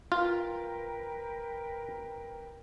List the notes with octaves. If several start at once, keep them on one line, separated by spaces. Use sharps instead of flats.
F4 A#4 B4 G5